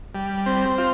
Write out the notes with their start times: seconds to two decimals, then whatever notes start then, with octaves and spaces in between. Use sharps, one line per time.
0.15 G3
0.46 C4
0.78 F4